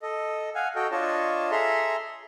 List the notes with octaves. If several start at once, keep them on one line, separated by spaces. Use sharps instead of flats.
A4 D#5
F5 F#5 G#5
F#4 A4 D#5 G5
D4 F4 C#5 D#5 A5
G#4 A4 E5 A#5 C6